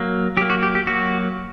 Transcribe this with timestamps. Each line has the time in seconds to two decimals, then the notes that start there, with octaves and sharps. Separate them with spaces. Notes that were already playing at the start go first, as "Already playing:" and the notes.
Already playing: F#3 A#3
0.37 F#3 G4
0.41 A#3
0.50 F#4
0.63 G4
0.75 G4
0.87 F#3 A#3 F#4